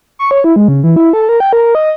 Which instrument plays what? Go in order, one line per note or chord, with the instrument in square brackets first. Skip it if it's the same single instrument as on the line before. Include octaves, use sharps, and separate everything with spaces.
[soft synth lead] C#6
C#5
E4
G#3
C#3
E3
E4
A4
A#4
G5
A#4
D#5